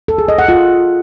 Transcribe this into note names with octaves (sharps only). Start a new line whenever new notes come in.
A4
G#4
D#5
F#5
F4